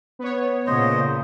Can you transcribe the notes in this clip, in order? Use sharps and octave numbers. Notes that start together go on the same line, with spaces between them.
B3 C#5
A#2 C#3 C5 D#5